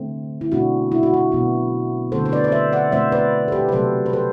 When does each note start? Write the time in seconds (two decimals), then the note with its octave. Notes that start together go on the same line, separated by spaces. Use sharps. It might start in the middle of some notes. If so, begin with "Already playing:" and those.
Already playing: D3 A3 C4
0.41 E4
0.52 B2 A3 C4 D4 F#4
0.92 E4
1.03 F#4
1.14 E4
1.32 B2 F#3 B3
2.12 D3 A3 C4 A4 C5
2.25 C5
2.32 B4 D5
2.44 D5
2.52 C5 E5
2.73 D5 F#5
2.92 B2 A3 C4 C5 E5
3.12 B4 D5
3.48 A4
3.52 G4 B4
3.69 B4
3.72 C3 F#3 A3 C4 A4 C5
4.06 B4
4.13 A4 C5